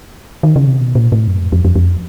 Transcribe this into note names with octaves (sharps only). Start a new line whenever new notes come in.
D#3
C#3
C3
B2
A#2
A2
F#2
F2
F2
F2
F2